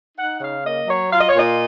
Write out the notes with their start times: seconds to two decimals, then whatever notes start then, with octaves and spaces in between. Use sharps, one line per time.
0.18 D#4 F#5
0.41 C#3 F5
0.64 A#3 D#5
0.88 F#3 C#5
1.12 F4 F5
1.20 D#5
1.28 C#5
1.36 A#2 D#5